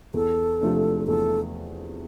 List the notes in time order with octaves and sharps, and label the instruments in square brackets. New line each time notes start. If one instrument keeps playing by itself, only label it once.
[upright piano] E2 [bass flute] A4
[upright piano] C3 F3 A3 D4
[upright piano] E2 [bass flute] A4